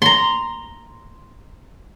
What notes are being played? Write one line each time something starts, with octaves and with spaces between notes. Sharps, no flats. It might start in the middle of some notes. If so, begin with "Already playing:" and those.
A#5 C6